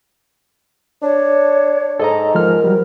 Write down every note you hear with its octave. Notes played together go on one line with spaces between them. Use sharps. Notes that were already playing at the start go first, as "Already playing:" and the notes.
D4 C#5
G#2 A4 D#5 A#5
F3 G#3 A#4 F6
F#3 G3